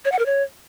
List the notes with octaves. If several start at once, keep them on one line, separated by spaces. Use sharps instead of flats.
C#5
F#5
A#4
C#5